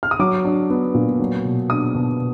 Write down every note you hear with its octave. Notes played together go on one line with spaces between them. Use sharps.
F6
D#6
F#3 D6
D4
B3
A#2
F#3
B2
D4 D#6
B2